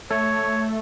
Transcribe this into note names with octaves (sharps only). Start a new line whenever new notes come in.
A3 C#5